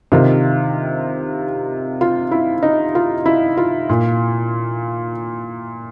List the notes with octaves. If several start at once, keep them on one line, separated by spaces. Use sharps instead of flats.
C3 D#3 F4
F4
E4
D#4
F4
E4
F4
A#2